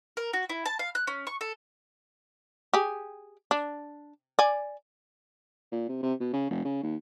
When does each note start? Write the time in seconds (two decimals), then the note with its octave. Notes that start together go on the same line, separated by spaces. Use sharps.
0.17 A#4
0.33 F#4
0.49 E4
0.66 A5
0.79 F5
0.95 F#6
1.07 C#4
1.27 C#6
1.41 A4
2.73 G4 G#4
3.51 D4
4.39 D5 G#5
5.72 A#2
5.89 C3
6.03 C3
6.20 B2
6.33 C#3
6.50 F1
6.64 C#3
6.83 D#2